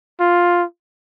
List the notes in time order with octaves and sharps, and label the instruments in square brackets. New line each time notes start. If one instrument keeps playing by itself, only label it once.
[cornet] F4